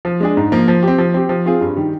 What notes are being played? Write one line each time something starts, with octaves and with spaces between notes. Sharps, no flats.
F3
G#3 D4 G#4
G#2
F3 A#3
F3
C4 G4
F3
C4 G4
F3
C4 F4 G#4
G2
D#3 G3